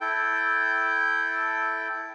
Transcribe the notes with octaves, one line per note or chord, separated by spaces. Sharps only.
E4 A4 G5